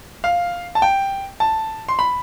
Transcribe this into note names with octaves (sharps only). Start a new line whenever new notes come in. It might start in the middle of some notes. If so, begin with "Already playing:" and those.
F5
A5
G5
A5
C6
B5